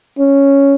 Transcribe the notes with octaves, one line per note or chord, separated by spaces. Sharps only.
C#4